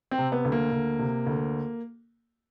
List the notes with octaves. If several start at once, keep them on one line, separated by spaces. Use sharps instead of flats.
C4
C3
B3
D2
A#3
D2
C3
D2